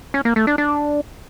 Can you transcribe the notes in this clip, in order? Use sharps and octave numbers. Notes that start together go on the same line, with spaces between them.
C#4
A#3
A3
D4
D4